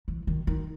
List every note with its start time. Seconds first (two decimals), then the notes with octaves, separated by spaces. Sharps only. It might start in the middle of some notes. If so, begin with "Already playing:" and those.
0.08 E3
0.27 D#3
0.47 D#3